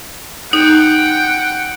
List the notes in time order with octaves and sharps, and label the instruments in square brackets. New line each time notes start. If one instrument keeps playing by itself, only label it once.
[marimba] D#4 [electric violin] F#5 G5